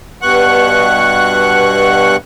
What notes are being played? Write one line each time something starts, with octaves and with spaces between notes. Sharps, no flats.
G2 B2 F#5 C#6 F#6